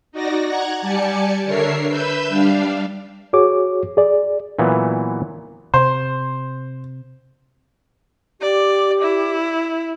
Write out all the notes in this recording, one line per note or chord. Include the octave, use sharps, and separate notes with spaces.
D#4 F#4 D5 A#6
F#5 A#5 F#6 G#6
G3 G4 D5 G#5 A5 C#7
D3 D4 A#4 C#5 E5 C7
B4 E5 B5 E6 G6
G3 D4 F5
F#4 G#4 C#5 D6
G#4 D5
A#2 E3 F#3 B3
C3 C5
G4 D5
E4